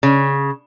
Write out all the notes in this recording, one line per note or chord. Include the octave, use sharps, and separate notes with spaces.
C#3